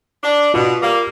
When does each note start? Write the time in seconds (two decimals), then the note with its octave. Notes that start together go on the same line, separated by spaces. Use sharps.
0.23 D4
0.54 B2 F4
0.82 G3 A#3